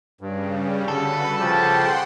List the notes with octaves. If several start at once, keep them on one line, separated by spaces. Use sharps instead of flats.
G2 C#3 G3
D3 F#4 A4 B4 B5
C#3 F3 G4 F#5 G5 A5 C6